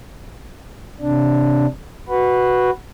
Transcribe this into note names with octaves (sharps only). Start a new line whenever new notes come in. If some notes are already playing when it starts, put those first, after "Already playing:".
C3 D4
F#4 B4